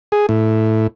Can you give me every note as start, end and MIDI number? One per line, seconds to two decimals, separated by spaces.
0.12 0.26 68
0.29 0.87 45